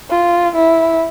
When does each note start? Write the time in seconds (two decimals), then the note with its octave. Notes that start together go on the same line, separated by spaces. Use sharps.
0.10 F4
0.55 E4